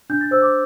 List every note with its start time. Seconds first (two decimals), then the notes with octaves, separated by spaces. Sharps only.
0.10 D4 G6
0.21 A6
0.31 C5 E6
0.42 D6